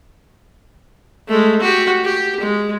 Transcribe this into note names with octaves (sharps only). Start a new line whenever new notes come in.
G#3 A3
F#4 G4
G4
G#3